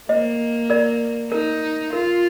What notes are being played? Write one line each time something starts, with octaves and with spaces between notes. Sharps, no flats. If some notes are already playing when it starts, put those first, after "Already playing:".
A#3 C5 D#5
A#4 D5
D#4 A#4
F4 A#4